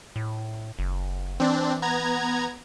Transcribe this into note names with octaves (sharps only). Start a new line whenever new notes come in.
A2
F#1
E3 C4 D4
B3 A#5 G#6